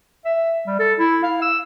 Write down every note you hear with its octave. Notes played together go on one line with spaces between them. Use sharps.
E5
G3
A4
E4
F5
E6